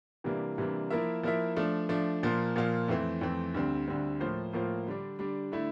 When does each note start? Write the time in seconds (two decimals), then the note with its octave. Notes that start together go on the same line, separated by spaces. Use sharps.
0.24 C3 E3 G3 A#3 D4
0.58 C3 E3 G3 A#3 D4
0.90 F3 A#3 E4 A#4 E5
1.23 F3 A#3 E4 A#4 E5
1.56 F3 A3 D4
1.89 F3 A3 D4
2.23 A#2 F3 A#3 F4
2.56 A#2 F3 A#3 F4
2.88 F2 E3 A3 C4
3.21 F2 E3 A3 C4
3.54 D2 D3 G3 C4
3.88 D2 D3 G3 C4
4.20 A2 F3 A#3 F4 C5
4.53 A2 F3 A#3 F4 C5
4.87 D3 G3 D4
5.19 D3 G3 D4
5.52 D3 A3 E4